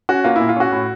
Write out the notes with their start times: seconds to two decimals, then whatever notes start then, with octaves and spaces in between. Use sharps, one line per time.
0.09 C#4 F#4
0.24 A#3 F4
0.36 A#2 E4
0.49 F4
0.56 C#4 F#4
0.72 A2